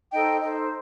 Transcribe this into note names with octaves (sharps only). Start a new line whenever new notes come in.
D#4 A4 C5 D#5 G5
D#4 A4 C5 D#5